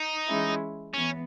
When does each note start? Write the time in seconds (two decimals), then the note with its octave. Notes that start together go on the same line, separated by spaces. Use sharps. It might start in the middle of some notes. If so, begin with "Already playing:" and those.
Already playing: D#4
0.26 E3 G#3 C#4 E4
0.94 E3 B3 C#4